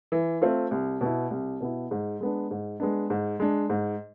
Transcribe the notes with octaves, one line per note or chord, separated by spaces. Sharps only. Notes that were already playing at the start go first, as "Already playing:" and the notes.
E3
A3 C4 F4
C2
B2 B3 E4
C2
B2 B3 E4
G#2
G#3 B3 D4
G#2
G#3 B3 D4
G#2
G#3 D4
G#2